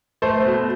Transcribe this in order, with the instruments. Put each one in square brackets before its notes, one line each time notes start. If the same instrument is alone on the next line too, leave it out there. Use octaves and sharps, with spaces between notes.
[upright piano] A3 C5
B2